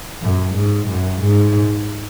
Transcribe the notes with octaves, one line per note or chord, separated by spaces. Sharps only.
F#2
G#2
F#2
G#2